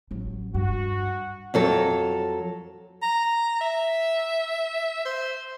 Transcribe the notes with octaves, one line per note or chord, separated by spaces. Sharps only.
A1 F#3
G2 F#4
F2 F#3 A4 A#5
A#5
E5
C5